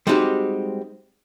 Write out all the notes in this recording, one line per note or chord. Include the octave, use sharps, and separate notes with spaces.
G3 G#3 C4 D#4 F#4 G4